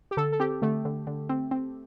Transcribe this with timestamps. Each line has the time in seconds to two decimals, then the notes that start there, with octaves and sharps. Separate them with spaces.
0.11 G4
0.17 D3 A4
0.32 A4
0.40 C4 G4
0.62 D3 A3
0.85 D3
1.07 D3
1.29 C4
1.51 C4